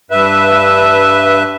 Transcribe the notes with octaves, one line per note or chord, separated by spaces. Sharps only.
G2 B4 E5